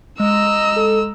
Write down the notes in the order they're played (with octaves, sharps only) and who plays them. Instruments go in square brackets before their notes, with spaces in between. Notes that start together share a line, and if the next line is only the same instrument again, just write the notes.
[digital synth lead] G#3 [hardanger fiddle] D#5 A#5 [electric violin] E6
[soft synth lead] A4